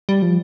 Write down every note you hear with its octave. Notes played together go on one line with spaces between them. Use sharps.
G3
F3